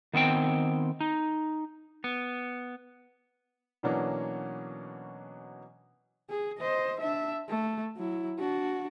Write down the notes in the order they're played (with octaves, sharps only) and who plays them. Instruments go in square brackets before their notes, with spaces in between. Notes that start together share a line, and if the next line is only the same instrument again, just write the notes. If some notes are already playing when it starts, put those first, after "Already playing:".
[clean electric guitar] D#3 B3 C4 G5
D#4
B3
[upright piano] B2 E3 F#3 A#3 C#4 D4
[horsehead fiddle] G#4
C5 D#5
D4 E5
A3
F#3 E4
D4 F#4